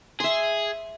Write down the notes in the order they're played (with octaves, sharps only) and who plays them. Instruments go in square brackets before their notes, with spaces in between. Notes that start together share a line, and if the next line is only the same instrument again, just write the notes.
[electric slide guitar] G#4 [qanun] E5 C6